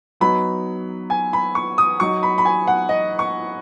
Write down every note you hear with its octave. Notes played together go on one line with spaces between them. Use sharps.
F#3 B3 D#4 B5
G#5
B5
C#6
D#6
F#3 D#4 C#6
B5
B5
G#5
F#5
D#5
C#6